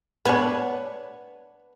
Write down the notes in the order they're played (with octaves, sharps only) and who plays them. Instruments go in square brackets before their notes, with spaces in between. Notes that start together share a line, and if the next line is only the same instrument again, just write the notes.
[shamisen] B3 D4 [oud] B4 C#5